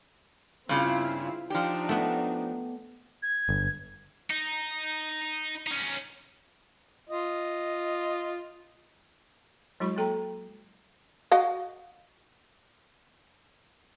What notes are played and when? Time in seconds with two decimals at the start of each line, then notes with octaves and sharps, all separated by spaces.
0.69 G2 C#3 C4 E4 F4
1.50 F3 D4 D#4 G4
1.89 A3 B3
3.23 G#6
3.49 G1
4.30 D#4
5.67 C#4 D#4
7.09 F4 D#5
9.80 F#3 G#3 E4 F#4 B5 C#6
9.97 F#3 A#3 A4 G5 A#5
11.32 F#4 D#5 F5